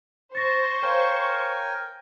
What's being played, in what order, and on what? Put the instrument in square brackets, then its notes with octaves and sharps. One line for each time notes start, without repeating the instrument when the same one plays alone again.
[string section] C5 [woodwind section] C#6 [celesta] A6 A#6
[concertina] A#4 G5 G#5 [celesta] C#5 F5